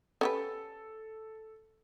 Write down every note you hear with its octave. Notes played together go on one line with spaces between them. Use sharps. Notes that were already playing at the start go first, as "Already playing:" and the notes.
C#4 G4 A4 B4